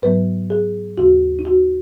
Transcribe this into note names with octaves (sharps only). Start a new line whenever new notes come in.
G#2 F#3 B3 B4
G#4
D#2 C#3 B3 F#4
D#4
F#4